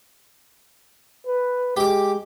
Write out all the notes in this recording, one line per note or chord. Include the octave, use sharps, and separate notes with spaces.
B4
G#3 G4 D6